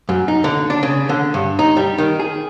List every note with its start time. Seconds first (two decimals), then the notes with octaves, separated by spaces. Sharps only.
0.09 F#2
0.28 D#4
0.44 D3
0.70 D4
0.83 C#3
1.09 D3
1.34 G2
1.59 D#4
1.77 G3
1.98 D#3
2.19 G#4